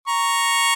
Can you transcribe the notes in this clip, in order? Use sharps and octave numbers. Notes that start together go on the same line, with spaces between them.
A#5 C#6